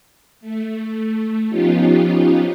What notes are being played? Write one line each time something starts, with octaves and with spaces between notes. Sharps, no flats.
A3
F3 B3 C#4 D#4 F4 G4